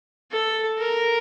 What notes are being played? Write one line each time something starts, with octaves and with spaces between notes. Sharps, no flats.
A4
A#4